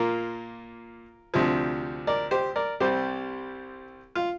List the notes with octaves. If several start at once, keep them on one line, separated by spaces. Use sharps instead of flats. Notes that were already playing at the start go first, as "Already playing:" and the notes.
Already playing: A#2 A#3 F4 A#4
D2 C3 F3
A#4 D5
G4 C5
A#4 D5
C2 C3 G3 C4 G4 C5
F4